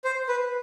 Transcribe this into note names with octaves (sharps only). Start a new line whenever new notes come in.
C5
B4